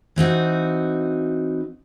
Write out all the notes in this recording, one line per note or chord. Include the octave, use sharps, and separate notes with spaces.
E3 C4 D#4 F#4